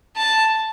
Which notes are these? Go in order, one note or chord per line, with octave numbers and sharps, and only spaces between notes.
A5